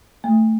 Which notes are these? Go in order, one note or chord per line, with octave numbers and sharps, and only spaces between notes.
A3